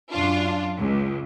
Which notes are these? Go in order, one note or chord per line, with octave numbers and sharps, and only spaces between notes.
F#2 D4 F4
C#2